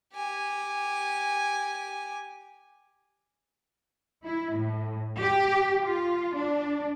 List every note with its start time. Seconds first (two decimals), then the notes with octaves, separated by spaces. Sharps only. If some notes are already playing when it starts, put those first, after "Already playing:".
0.13 G4 G#5
4.24 E4
4.57 A2
5.19 G4
5.83 F4
6.35 D4